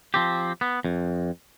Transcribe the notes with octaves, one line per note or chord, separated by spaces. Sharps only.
F3 C4 G4
B3
F2